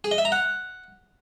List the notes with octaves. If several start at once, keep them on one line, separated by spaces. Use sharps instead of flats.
G#4
D#5
E5
A#5
F#5